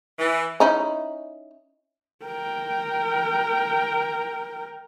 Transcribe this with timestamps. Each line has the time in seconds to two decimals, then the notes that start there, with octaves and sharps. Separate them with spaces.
0.19 E3
0.60 C#4 D#4 E4
2.25 A#4 G5